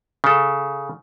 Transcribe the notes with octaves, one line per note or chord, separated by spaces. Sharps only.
C#3 A4